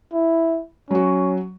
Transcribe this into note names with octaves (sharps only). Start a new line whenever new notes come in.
E4
F#3 C#4 F#4